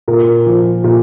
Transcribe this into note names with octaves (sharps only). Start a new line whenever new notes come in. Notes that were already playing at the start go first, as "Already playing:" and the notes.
A#2 A#4
F3
A#2